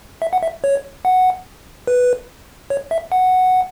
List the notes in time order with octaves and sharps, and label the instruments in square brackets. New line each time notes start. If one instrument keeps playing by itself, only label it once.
[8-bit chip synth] E5
F#5
E5
C#5
F#5
B4
C#5
E5
F#5